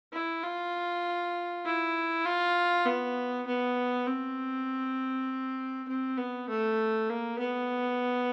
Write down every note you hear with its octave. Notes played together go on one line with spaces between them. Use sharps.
E4
F4
E4
F4
B3
B3
C4
C4
B3
A3
A#3
B3